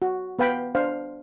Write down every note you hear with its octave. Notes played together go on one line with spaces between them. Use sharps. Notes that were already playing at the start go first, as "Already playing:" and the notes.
F#4
B3 B4 F5 G5 B5
D4 C5 F5